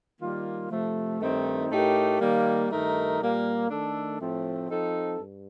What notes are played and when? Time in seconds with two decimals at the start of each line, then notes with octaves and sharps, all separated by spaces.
0.20 D#3 G3 A#3 F4
0.70 C3 F3 A3
1.21 G2 D#3 A3 C4 D#4
1.71 A2 A3 D#4 G4 A#4
2.20 D#3 G3 A#3
2.70 G2 D#3 A3 D#4 A#4
3.20 A#2 G3 A#3
3.70 D#3 A3 D4 A4
4.20 A2 F3 A3 C4
4.70 F3 C4 D#4 A4
5.19 G2